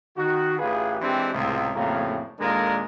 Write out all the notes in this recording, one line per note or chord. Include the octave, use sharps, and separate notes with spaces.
D#3 F#4
A1 F4 G4 G#4 B4
E3 G#3 C4 D4 G4
C#2 A2 C3
F2 A2 C#3 F#3 A#3
D#2 A#2 G#3 D4 A4 A#4